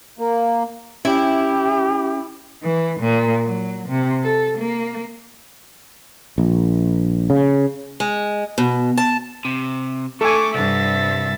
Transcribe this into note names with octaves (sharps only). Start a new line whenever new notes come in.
A#3
C#4 E4 G4
E3
A#2
F#3
C3
A4
A#3
A#1
C#3
G#3
B2
A5
C3
A3 A4 G#5 C#6 D6
C2 G2 E5 A6